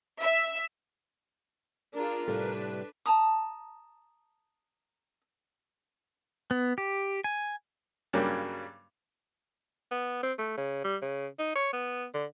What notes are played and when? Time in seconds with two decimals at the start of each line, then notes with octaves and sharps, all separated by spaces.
0.22 E5
1.95 D4 F4 G#4 A#4
2.28 A2 C3 G3 D4 A4 B4
3.06 A5 A#5 D#6
6.51 B3
6.78 G4
7.24 G#5
8.13 G2 C#3 F#3 G3 A#3
9.91 B3
10.23 C4
10.39 A3
10.57 C#3
10.84 G3
11.02 C#3
11.39 D#4
11.55 C#5
11.73 B3
12.14 D3